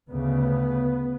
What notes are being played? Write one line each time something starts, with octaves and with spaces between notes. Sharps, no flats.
D2 C#3 B3